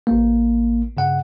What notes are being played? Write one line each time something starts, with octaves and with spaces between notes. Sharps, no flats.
A1 A#3
G2 C#3 F#5